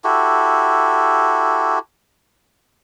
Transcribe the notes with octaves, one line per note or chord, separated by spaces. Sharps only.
E4 F#4 G4 A4